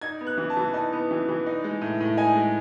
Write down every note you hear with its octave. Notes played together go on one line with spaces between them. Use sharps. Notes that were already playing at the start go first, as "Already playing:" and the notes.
D#4 G#6
B3
F#6
E3
A5
E3
D#4 A5
B3
E3
E3
D#4
G#3
A2
A2
D#4 G#5
G#3